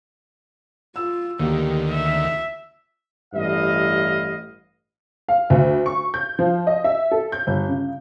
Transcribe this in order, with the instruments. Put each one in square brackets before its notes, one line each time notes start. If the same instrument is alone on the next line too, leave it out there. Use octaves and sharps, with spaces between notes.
[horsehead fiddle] F4 [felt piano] E6
[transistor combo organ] D2 D#3 [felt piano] A#3 [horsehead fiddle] G4
[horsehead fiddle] E5
[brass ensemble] A1 G2 E4 D#5 F5
[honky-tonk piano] F5
D2
C#6
G6
F3
D#5
E5
A4
G6
G1
C#3